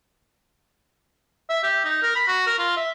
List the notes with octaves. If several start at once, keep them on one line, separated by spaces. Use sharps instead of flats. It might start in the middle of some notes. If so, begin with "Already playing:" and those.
E5
G4
D#4
A#4
B5
F#4
A#4
F4
E5